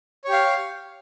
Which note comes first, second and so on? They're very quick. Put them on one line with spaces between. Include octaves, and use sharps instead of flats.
C#5 G4 F5